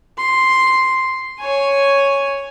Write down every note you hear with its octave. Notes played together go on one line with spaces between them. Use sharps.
C6
C#5 G#5